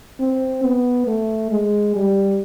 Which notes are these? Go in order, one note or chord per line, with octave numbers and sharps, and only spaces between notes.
C4
B3
A3
G#3
G3